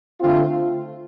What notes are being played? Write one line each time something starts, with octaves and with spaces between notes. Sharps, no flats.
D3 A3 C4 F4